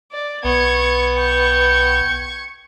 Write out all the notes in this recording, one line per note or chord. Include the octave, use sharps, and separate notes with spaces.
D5
B1 B3 C#6 G#6
G5 C#6 G#6